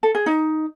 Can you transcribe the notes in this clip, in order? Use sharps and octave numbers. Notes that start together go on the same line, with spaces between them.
A4
G#4
D#4